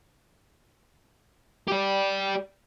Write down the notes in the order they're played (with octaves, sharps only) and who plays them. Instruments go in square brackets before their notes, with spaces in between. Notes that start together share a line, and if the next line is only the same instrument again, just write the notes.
[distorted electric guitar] G4 D5